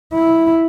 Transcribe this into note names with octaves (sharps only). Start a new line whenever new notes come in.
E4